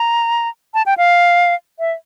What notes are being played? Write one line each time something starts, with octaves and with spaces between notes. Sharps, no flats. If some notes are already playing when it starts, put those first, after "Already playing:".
Already playing: A#5
A5
G5
F5
E5